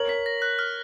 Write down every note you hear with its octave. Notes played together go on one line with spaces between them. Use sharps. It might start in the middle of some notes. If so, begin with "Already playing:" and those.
Already playing: A#4 C#5 F#7
B6
A#6
F#6
F6